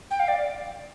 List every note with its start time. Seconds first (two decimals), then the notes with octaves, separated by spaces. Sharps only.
0.11 G5
0.20 F5
0.28 D5